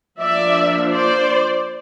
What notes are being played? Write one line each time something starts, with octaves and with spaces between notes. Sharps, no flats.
F3 A#3 D4 D5 E5
C5 D5